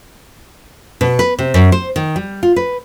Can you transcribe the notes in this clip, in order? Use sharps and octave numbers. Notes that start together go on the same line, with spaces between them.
B2
B4
C3
F#2
C5
D#3
G3
F4
B4